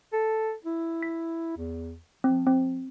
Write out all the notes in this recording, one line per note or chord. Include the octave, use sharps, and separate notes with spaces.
A4
E4
B6
E2
F3 C4
C4